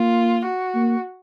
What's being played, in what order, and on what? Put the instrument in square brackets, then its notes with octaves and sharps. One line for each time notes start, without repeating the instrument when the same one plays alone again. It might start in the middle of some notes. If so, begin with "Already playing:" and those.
Already playing: [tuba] A#3 [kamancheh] F4
[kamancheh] F#4
[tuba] A#3